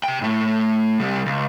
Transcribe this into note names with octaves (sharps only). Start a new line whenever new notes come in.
C3 G5
A2 A3
C3 G3
C#2